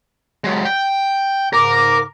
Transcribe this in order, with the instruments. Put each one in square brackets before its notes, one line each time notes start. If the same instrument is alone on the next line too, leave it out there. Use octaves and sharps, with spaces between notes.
[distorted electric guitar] F#3 G#3
G5
[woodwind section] G#2 C#3 D6 [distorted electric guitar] A#4